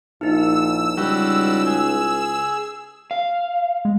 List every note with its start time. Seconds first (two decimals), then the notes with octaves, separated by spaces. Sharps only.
0.21 A#1 D#4 E4 E6
0.97 C#2 G3 F#4
1.67 G#4
3.11 F5
3.85 G#3